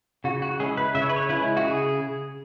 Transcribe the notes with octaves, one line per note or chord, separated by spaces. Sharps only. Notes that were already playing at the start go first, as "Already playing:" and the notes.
C#3 F#4
F#4
G#3 C#4 E4 G#4
B4
C#3 E5
C#5
B4
C#5
G#3 C#4 E4 B4
F#4
C#3 G#4